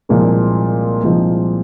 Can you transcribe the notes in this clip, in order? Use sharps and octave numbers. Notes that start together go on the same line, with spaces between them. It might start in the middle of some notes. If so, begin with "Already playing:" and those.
C2 A#2 F3 G#3 D#4
C2 A#2 F3 G#3 D#4